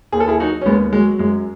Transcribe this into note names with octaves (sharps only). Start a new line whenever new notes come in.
D#2 G#4
A4
E4 G#4
F#3 D#4 F#4
C#4
D#2 G#3 B3
F#3 G#3
F#2 G#3